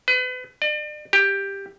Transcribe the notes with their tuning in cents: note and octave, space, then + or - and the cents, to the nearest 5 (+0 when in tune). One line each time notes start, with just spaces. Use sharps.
B4 +35
D5 +40
G4 +10